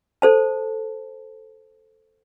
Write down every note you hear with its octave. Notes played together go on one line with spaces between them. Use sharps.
A4 C5 A5